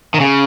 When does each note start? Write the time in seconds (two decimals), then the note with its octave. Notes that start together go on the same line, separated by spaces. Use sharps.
0.14 D#3
0.20 C#3